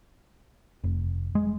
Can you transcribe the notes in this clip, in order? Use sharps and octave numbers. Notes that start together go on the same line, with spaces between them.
F1
G#3